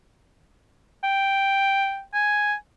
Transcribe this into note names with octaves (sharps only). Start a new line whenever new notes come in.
G5
G#5